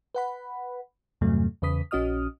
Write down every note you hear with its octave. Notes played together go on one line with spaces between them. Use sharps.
B4 F#5 B5
E2 G2 C3 F#3 A3
E2 C#3 B4 D#6 B6
A#1 C#4 F#4 D#5 D#6 F6